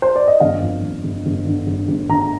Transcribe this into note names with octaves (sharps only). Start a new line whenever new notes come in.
C5
D5
D#5
G1 F5
F2
G1
G1
G1
D3
G1
G1
D3 A#5